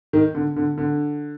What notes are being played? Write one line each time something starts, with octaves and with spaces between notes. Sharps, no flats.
D#3
D3
D3
D3